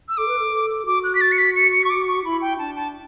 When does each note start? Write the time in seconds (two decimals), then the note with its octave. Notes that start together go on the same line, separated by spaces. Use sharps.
0.09 E6
0.17 A4 D6
0.28 B4
0.39 A4
0.52 A4
0.86 F#4 D6
1.04 F#6
1.15 B6
1.21 A6
1.32 C#7
1.38 B6
1.56 C#7
1.73 C#7
1.84 C#6
1.90 D6
2.07 C#6
2.25 E4 B5
2.41 G5
2.59 D4 A5
2.76 A5